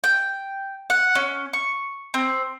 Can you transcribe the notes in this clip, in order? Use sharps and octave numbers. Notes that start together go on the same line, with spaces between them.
G5
F#5
C#4
C#6
C4